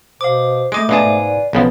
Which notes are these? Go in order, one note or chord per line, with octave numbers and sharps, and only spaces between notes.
B2 C5 F5 D6
G#3 A3 D#5 D6 D7
B2 G#3 D4 B4 D5 F5 G#5 A5
G#2
D5
B1 C#3 F3 B3 B4